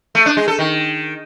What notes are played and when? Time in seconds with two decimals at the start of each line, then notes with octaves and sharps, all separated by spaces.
0.15 A3
0.26 D4
0.37 G#3
0.48 A4
0.59 D#3